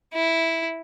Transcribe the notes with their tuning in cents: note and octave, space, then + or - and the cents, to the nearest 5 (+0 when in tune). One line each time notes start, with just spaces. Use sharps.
E4 -5